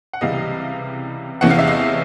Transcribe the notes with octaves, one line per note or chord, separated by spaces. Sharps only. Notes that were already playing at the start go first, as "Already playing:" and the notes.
F#5
C#2 C3 E3 G3 D#5 F5
E2 C3 E3 A3 C#4 F#5
F5
E5
D#5 F5